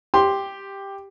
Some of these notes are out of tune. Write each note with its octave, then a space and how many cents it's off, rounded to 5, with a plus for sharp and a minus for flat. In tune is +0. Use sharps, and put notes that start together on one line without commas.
G4 +5 C6 +0